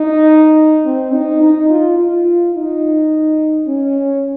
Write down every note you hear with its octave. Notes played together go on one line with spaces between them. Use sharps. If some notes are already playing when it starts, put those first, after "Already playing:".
Already playing: D#4
C4
D#4
D#4
F4
F4
D#4
C#4